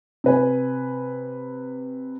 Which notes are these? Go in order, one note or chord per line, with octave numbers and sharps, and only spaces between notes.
C3 B4 G#5